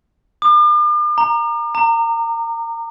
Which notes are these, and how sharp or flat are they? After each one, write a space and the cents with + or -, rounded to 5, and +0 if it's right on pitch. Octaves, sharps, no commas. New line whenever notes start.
D6 +45
A#5 -5
A#5 -25